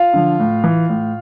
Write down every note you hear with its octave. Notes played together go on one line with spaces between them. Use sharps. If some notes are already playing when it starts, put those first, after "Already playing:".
Already playing: F4 F5
D3 F3
A2
E3
A2